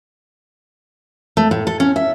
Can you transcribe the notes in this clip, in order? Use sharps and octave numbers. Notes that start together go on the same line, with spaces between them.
A3
A2
A4
C#4
E5